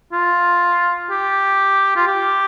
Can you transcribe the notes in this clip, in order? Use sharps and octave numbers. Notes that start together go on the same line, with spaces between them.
F4
G4
F4
G4